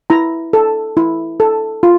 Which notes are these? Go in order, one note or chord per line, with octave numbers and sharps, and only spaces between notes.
E4 A#5
A4
E4
A4
F4